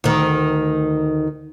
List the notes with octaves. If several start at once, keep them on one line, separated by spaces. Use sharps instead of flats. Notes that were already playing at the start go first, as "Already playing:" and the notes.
D2 D#3